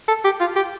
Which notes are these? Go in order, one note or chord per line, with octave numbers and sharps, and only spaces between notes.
A4
G4
F4
G4